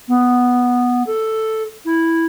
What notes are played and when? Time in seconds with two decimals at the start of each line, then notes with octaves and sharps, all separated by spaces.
0.08 B3
1.06 A4
1.85 E4